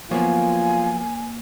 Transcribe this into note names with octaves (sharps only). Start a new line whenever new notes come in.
F3 F#3 A#3 B3 F4 C#5 G#5